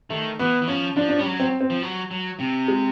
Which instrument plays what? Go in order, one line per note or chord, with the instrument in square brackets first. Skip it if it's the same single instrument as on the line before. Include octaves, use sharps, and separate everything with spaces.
[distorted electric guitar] D#3 [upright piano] A3
[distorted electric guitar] E3 [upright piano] B3
[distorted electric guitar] E3
[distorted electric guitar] F3 [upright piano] C#4
[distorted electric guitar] F3 [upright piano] D4
[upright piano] D4
[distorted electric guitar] G3 [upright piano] C#4
[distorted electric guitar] F#3
[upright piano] C4
C4
[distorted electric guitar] F3
F#3
F#3
C3
[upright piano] G#3